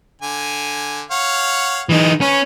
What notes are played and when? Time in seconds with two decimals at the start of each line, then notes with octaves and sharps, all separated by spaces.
0.22 D3 G#5
1.11 C#5 F5 F#5
1.89 E3 G#3 D#4
2.21 C#4 B4 C#5